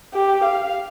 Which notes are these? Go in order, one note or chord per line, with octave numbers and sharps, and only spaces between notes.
G4
F5